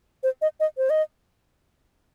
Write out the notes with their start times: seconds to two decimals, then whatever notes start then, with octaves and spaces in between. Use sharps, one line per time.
0.23 C5
0.41 D#5
0.60 D#5
0.77 C5
0.90 D#5